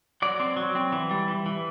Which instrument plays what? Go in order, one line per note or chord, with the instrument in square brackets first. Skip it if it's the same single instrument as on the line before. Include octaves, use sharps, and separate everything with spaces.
[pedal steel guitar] F#3 D5
C4
F#3
C4
E3
G3
E3
E3